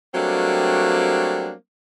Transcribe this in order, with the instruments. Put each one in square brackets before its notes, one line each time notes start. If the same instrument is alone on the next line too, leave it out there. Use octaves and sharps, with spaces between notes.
[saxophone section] F#3 G3 A3 A#3 C4 D4